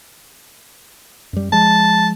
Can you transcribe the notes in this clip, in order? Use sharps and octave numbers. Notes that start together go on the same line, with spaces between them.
F#2 G3
F3 G#3 A5